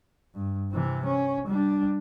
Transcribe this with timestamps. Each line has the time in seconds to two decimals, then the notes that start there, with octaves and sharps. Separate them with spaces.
0.35 G2
0.72 C3 E3
1.06 C#4
1.48 G3 D4